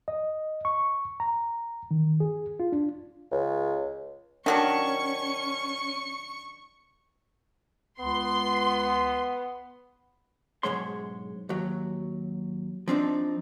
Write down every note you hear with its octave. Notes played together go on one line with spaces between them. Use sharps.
D#5
C#6
A#5
D#3
G#4
F4
D4
C#2
D#3 F#3 C#4 D4 C#6 C#7
C#2 B3 C6
B1 F2 G#2 G#3 C#5 C6
D#2 F#3
F3 C4 D4 D#4